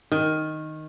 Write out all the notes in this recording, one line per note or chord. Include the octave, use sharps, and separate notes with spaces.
D#3